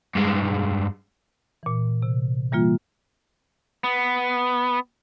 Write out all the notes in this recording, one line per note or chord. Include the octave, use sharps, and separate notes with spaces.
G2 G#3
A#2 E3
C3
E3 G3 A#3 F4
B3